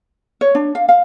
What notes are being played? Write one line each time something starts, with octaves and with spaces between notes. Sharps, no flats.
C#5
D4
F5
F5